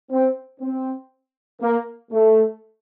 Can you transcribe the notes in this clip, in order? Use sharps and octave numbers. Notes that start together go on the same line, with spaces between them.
C4
C4
A#3
A3